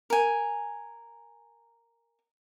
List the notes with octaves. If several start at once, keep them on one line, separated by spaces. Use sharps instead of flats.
A#4 G#5